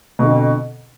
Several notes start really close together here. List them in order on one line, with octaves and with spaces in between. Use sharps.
B2 D3 F2